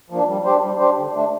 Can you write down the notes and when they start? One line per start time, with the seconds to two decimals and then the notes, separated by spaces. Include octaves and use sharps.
0.10 F3 A#3 D4
0.28 G3
0.45 D4 G4 C5
0.62 G3
0.79 D4 G4 C5
0.97 D3
1.14 A3 D4